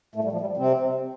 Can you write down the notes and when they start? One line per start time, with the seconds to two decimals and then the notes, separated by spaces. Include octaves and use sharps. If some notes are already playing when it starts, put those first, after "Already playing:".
0.15 A2 A3
0.24 G3
0.32 F3
0.41 G3
0.57 C3 C4